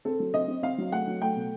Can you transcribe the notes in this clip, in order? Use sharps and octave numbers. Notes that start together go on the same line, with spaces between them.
C4 A4
F#3
C4 D#5
C4
C4 F5
F#3
A3 F#5
F#3
A3 G5
B2